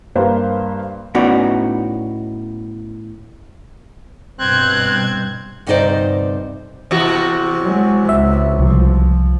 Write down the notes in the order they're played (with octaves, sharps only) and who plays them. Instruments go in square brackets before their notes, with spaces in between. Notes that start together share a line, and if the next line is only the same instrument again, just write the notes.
[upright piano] G2 A#3 B4 C5 F5
[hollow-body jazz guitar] A2 B3 C#4 D#4 F#4 D5
[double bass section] G2 B2 [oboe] C4 [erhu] F#6 [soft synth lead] G#6
[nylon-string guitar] D2 G2 C3 D#4 C5 D5
[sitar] E2 C3 F#4
[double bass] F#3 G#3
[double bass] C#2 [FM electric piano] E5
[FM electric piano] C2 [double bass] F3